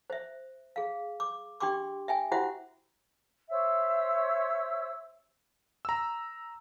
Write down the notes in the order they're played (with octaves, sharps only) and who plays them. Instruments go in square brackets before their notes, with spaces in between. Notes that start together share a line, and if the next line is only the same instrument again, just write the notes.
[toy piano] C5 E5
G#4 F5
D6
D4 G4 G5 C6 D6
E5 G5 G#5
E4 F#4 G4 C5 E5 F#5
[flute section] C5 C#5 E5 E6
[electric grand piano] A#5 E6